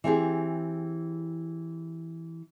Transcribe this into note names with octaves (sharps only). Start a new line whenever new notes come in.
E3 C4 G4 G#4